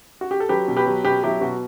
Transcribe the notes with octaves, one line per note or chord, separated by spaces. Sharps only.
F#4
G4
A4
F#3 G4 B4
B2
G4 B4
F#3
B2 G4 B4
F#3 E4 G4
B2 F#4